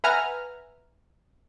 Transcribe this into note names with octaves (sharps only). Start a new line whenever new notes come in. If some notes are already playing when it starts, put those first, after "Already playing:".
B4 E5 F#5 G#5 A#5 F6